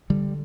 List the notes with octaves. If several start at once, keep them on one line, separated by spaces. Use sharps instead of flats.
D3 G3